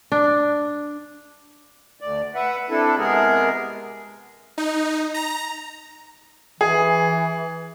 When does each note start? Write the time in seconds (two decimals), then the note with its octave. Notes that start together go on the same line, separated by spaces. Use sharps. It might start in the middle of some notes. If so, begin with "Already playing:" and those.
0.12 D4
2.01 D2 D5
2.35 B4 E5 F#5
2.70 C4 D4 E4 A4
2.98 C3 G#3 B3 G#4 A#4
4.58 D#4
5.14 A#5
6.61 E3 G#4